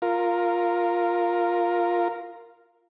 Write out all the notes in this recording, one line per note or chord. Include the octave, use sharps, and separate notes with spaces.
F4 A#4